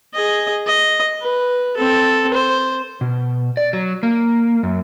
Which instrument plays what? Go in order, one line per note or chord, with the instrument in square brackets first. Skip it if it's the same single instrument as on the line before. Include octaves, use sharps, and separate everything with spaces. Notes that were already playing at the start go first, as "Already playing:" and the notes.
[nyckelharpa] G#4 D#5
D#5
B4
C4 A4
C5
[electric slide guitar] B2
D5
F#3
A#3
F#2